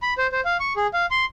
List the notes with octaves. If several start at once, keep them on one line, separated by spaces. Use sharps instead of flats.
B5
C5
C5
F5
C#6
G#4
F5
C6